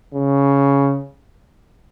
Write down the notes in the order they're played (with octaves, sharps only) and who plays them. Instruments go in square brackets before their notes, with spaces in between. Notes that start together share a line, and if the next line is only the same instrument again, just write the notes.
[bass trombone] C#3